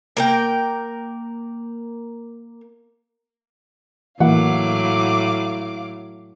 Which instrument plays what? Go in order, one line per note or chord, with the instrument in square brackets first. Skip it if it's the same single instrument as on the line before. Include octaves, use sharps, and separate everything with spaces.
[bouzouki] A#3 A#4 G5
[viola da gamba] A2 F#3 [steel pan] E3 A#3 [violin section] F5 D6 [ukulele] F#5